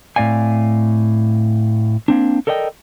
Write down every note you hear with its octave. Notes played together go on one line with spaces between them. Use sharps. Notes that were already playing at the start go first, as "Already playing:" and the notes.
A2 C4 D5 F5 G#5
A#3 C4 D4
A4 A#4 D5 D#5 G5